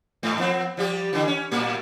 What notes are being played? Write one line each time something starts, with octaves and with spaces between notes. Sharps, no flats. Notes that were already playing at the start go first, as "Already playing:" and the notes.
G#2 A3
F3 B3 C4
F3 G3 G4
D3 E3
C#4
A2 G3 A#3